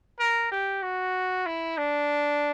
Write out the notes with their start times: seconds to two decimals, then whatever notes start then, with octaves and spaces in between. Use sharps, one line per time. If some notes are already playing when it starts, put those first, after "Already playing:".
0.20 A#4
0.51 G4
0.83 F#4
1.46 E4
1.78 D4